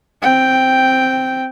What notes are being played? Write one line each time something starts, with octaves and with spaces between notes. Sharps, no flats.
C4 G5